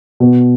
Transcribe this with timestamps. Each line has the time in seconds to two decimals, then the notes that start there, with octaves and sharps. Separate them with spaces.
0.20 B2